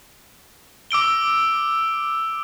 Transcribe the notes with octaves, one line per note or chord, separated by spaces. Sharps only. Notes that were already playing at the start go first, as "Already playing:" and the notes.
D6 E6 D7 G7